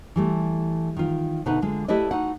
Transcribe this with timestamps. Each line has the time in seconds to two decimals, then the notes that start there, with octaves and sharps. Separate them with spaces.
0.16 E3 G3 A3
0.97 D#3 F4
1.46 B2 D3 D#4 B4 E5 F#5
1.62 D3 G#3 F4
1.88 A3 E4 G4 B4 D5 D#5
2.11 D#4 F#4 F#5